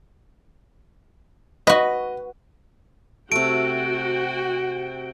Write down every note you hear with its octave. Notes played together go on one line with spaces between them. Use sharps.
F#4 B4 D#5
C3 A3 F#4 G5 D7